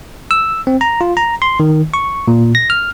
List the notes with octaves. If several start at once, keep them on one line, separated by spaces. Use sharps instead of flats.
E6
C4
A#5
F4
A#5
C6
D#3
C#6
A#2
A#6
F6